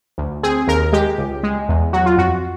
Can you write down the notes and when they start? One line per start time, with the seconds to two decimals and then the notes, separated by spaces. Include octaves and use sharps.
0.18 D2
0.43 C4 G#4
0.68 D#2 A#4
0.93 G#3 G4
1.18 C#2
1.43 G#3
1.69 E2
1.93 F#3 F#4
2.06 F4
2.18 F2 F#4